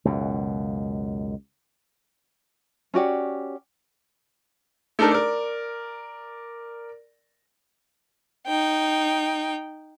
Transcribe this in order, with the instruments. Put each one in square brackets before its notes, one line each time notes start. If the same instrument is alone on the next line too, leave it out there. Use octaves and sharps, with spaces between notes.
[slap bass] C#2 F#2 B2
[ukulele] C#4 F#4 G4 D5
[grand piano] A3 D4 D#4 A4 A#4
A#4 D5
[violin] D#4 G5